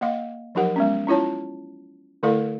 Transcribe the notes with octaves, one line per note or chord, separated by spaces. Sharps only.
A#3 D#5 F5
F3 F#3 D#4 G4 A#4 F#5
G#3 B3 C#4
C#4 E4 F4 C#5 A5
D3 A3 E4 A4 D5 F5